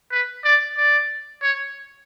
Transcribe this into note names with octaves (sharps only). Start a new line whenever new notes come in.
B4
D5
D5
C#5